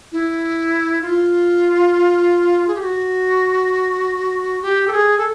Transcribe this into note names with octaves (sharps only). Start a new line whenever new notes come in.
E4
F4
G#4
G4
F#4
G4
A4
G#4
A4